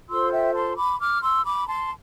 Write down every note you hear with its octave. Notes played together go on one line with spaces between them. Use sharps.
F4 A4 C5 C6 E6
E5 G5
A5 C6
B5 D6
D6 F6
C6 E6
B5 D6
A5 C6